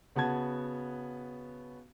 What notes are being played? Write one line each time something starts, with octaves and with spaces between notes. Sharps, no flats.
C#3 B3 F#4 A5 G#6